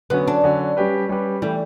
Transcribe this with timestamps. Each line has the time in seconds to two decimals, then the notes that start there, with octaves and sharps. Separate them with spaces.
0.10 D3 F#3 B3 C#4
0.28 D4
0.44 D3 F#3 C#4
0.77 G3 C#4 G4 B4
1.09 G3 C#4 G4 B4
1.42 E3 G3 A3